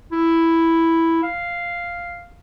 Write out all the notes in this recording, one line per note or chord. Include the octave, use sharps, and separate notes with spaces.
E4
F5